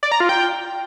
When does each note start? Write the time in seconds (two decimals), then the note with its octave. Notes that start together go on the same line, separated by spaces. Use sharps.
0.03 D5
0.12 A#5
0.20 F4
0.29 G5